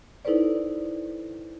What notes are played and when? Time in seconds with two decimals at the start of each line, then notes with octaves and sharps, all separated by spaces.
0.25 D#4 E4 A4 B4 C5 D5